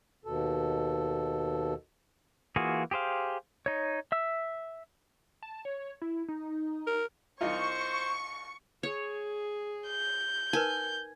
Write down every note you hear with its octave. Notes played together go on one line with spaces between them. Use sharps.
D#2 B2 A4
E3 A#3 F4 F#4 G#4
G4 G#4 C5 F5
D#4 C#5
E5 E6
A5
C#5
E4
D#4
A#4
C2 D#4 F4 C5 C#6
G#4 C#5
G6
D#4 A#4 B4 G#5